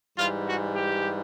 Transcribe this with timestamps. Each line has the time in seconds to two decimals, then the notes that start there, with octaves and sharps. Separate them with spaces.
0.16 G#2 E3 G3 F4
0.46 F#4
0.75 G4